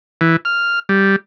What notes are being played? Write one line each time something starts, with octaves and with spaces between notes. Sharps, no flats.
E3
F6
G3